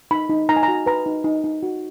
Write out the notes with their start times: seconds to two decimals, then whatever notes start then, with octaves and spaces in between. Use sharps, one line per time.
0.11 D#4 B5
0.30 D#4
0.49 D#4 A#5
0.56 G#5
0.63 A#5
0.68 F#4
0.86 B4 A#5
1.06 D#4
1.24 D#4
1.44 D#4
1.63 F#4